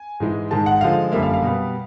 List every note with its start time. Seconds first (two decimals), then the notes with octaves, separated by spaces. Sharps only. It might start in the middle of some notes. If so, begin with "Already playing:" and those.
Already playing: G#5
0.20 G#2 E3 G#3
0.51 G#2 D#3 G#3 A5
0.66 F#5
0.81 D3 F3 G#3 F5
1.12 F#2 D3 G3 A#3 E5
1.23 F5
1.34 F5
1.43 B2 G3 B3